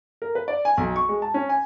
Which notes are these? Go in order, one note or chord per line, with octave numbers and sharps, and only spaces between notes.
A#4
B4
D5
G#5
B1
C#6
G#3
A5
C#4
G#5